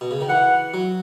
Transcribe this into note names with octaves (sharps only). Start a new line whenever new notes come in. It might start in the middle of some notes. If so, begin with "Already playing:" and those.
B2
C#3
D#3
E3 F#5
F#3